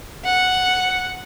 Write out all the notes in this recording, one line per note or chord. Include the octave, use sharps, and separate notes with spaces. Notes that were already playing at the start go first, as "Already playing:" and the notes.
F#5